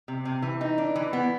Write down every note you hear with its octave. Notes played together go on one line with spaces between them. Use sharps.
C3
C3
E3
D#4
D4
E3
B3